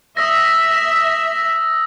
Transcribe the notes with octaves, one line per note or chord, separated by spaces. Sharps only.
E5 D#6 E6 A#6